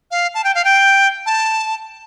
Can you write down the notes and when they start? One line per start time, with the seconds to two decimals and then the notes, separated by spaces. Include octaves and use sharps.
0.11 F5
0.35 A5
0.44 G5
0.55 F5
0.65 G5
1.26 A5